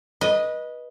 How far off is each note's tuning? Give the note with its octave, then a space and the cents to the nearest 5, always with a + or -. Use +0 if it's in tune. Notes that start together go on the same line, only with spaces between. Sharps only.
B4 -20 D#5 +0